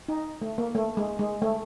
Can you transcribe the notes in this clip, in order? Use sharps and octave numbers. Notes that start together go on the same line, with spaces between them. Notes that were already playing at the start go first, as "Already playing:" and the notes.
D#4
A3
A#3
A3
G#3
G#3
A3